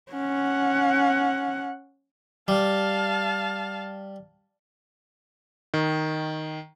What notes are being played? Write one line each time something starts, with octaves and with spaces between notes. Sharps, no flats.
C#4 F#5
G3 F5 A5
D#3